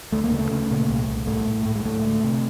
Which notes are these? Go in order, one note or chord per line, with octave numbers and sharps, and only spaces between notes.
D2 A3
A#3
C#3 A3
C#3
A#2
C2
C2
A2 A3
A2
A2
G#3
D2 A3
D2
C3